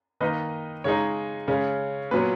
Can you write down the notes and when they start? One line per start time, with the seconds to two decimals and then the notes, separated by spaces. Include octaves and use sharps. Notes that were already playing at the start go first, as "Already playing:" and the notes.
0.21 D#3 A#3 D#4 B4 D#5
0.84 C#3 G#3 D#4 C#5
1.48 C#3 G#3 C#4
2.11 A#2 F#3 B3 B4